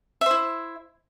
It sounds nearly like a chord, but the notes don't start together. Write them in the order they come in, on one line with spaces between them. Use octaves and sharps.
E5 C5 E4